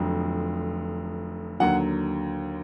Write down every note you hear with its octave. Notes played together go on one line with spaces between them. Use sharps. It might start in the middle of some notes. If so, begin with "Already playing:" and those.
Already playing: F1 F2 D3 F#3
D#2 D3 F#3 F#5